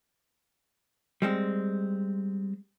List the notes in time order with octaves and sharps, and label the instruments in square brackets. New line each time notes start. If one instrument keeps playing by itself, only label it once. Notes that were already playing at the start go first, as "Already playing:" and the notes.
[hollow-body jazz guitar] G3 G#3 C4